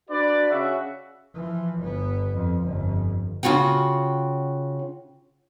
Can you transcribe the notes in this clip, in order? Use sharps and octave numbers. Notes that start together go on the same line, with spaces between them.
D4 F#4 B4 D5
C#3 F#4 E5
E3 F3
G1 B3
F2
G1 F2
C#3 F4 F#4 F#5 G5